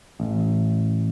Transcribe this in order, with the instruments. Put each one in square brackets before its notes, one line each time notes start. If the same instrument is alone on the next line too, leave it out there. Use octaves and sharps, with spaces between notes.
[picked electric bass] A1